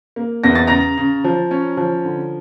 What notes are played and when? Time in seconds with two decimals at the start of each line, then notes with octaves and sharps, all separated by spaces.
0.16 A#3
0.44 E2 A#6
0.55 A6
0.67 C#3 A#5 A#6
0.98 C#3
1.24 F3
1.51 C#4
1.77 F3
2.05 D3